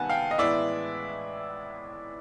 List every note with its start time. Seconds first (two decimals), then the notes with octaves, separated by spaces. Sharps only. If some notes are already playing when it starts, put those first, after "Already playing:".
Already playing: C#2 C3 D#3 G3 B3 F#5 G#5 A5
0.09 F5 G5
0.31 D#5
0.38 A2 E3 G#3 B3 E4 D5 E5